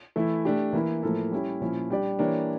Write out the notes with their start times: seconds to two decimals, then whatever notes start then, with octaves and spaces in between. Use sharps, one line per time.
0.16 E3 A3 E4
0.45 A3 D4 G4
0.73 E3 A#3 E4
1.03 A2 F3 A#3 E4 A4
1.31 G3 C#4 E4 G4 C#5
1.61 A#2 F3 C#4 E4
1.90 G3 D4 G4 D5
2.19 E3 A#3 D4 G4 C#5